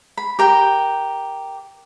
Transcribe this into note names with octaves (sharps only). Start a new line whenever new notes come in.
B5
G4 A#4 G5